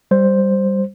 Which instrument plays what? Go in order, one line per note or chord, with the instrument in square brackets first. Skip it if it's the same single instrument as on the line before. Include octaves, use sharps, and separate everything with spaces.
[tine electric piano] G3 C5